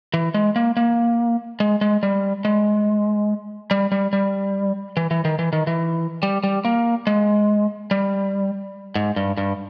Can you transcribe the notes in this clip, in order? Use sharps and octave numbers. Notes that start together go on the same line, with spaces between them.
E3
G#3
A#3
A#3
G#3
G#3
G3
G#3
G3
G3
G3
E3
E3
D#3
E3
D#3
E3
G3
G3
A#3
G#3
G3
G#2
G2
G2